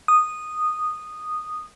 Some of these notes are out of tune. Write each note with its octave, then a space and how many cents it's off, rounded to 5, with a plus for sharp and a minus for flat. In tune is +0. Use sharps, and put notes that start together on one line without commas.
D#6 -10